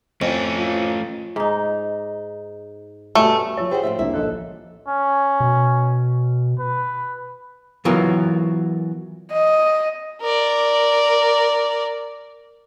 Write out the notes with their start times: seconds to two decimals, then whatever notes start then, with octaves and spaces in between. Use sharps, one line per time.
0.22 F2 A3 C#4
0.58 F4
1.36 G#2 D#4
3.15 G2 B2 A3 C#4
3.57 F3 C#5 E6
3.71 G4 G#4 C5 F#5
3.83 A2 F4 E5
3.99 C2 A#3 D4 E5
4.13 A#1 A4 D#5 F#6
4.88 C#4
5.40 B2
6.59 B4
7.85 E3 F#3 B3 F4 A#4
9.32 D#5
10.21 A#4 D5